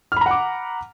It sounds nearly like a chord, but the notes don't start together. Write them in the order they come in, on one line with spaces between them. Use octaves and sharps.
F6 B5 A#5 F#5 D6